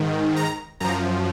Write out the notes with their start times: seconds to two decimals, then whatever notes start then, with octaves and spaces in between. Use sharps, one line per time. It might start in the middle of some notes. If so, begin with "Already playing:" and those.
Already playing: G#2 D#3
0.36 A#5
0.80 F#2 F3 A#5